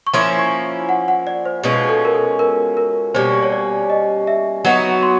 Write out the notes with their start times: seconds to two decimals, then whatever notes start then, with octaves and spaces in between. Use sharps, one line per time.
0.07 C#6
0.14 F3 A#3 C#4 E4 C6
0.39 C#6
0.89 F#5
1.08 F#5
1.27 D5
1.45 C5
1.63 B2 G#3 C#4 F4 B4
1.89 A4
2.05 A#4
2.14 A4
2.39 A#4
2.77 A#4
3.14 B2 G3 A#3 C#4 C5
3.43 C#5
3.52 D5
3.90 D#5
4.27 E5
4.65 F#3 B3 D#4 F#4 F#5
5.03 C6